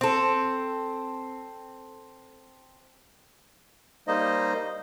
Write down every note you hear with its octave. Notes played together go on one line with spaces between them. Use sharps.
C4 A4
G3 A#3 D#4 C5 D#5